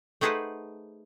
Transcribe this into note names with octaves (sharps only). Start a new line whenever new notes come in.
A3 D#4 G#4 B4 C5 F#5